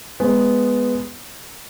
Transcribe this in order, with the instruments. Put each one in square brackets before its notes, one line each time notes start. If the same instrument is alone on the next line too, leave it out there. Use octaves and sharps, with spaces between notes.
[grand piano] G#3 B3